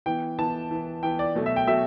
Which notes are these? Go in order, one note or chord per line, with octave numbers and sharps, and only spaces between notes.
E3 B3 G5
E3 B3 A5
E3 B3
E3 B3 G5
D5
B2 F#3 A3
E5
G5
B2 F#3 A3 E5